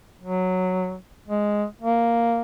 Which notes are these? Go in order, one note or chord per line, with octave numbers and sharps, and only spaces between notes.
F#3
G#3
A#3